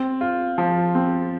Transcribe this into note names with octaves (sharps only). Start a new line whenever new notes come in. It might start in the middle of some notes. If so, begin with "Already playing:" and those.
Already playing: C4
F4
F3
C4